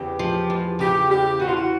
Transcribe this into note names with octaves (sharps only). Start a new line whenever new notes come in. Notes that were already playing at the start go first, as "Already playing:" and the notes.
Already playing: E2 C#3 G4
F3
E2
C#3 G4
E2 G4
E3 F#4
F4
F#4